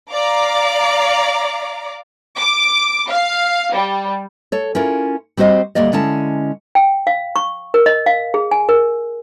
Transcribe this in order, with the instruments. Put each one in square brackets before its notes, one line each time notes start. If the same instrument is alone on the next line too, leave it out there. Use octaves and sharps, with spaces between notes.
[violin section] D5 F5 A#5 D6
[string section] D6
F5
G3
[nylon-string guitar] A4 C#5
C#4 E4 F4 A#4
G3 C4 F#4 C5 D#5
D2 G3 A#3 D5 D#5
D3 G#3 C#4 E4 A5
[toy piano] G5
F5
C#6
A#4
D#5
F5
G#4
G#5
A#4